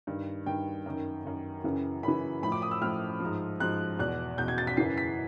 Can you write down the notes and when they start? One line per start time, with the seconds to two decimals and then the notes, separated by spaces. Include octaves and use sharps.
0.07 G2 D#3
0.46 G2 D#3 G5
0.86 F#2 D#3
1.25 F#2 D#3
1.64 F#2 C#3 E3
2.03 F#2 C#3 E3 B5
2.42 A2 F3 B5
2.52 D6
2.62 D#6
2.71 E6
2.81 A2 F3 F6
3.20 G#2 F3
3.60 G#2 F3 F#6
3.99 E2 B2 F#6
4.38 E2 B2 G6
4.48 G#6
4.58 A6
4.67 B6
4.77 F#2 C#3 E3 C7
4.98 B6